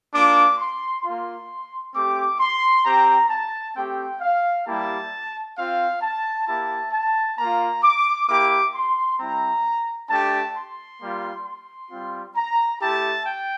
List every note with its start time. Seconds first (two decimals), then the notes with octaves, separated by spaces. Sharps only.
0.13 A#3 D4 F4 D6
0.58 C6
1.04 A#3 F4 C6
1.94 A3 C4 G4 D6
2.40 C6
2.85 C4 G4 A#5
3.30 A5
3.75 A3 C4 G4 G5
4.21 F5
4.66 G3 A#3 E4 G4 A5
5.56 C4 F4 F5
6.02 A5
6.47 A#3 E4 G4 A5
6.92 A5
7.38 A#3 F4 A#5
7.83 D6
8.28 A#3 E4 G4 D6
8.74 C6
9.19 G3 C4 E4 A#5
10.10 A3 D4 G4 A5
10.55 C6
11.00 G3 A#3 F4
11.46 C6
11.91 G3 C4 F4
12.36 A#5
12.81 A3 E4 G4 A5
13.26 G5